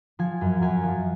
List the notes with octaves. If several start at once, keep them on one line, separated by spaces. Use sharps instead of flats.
F3 G#5
F#2
F#2 G#5
F3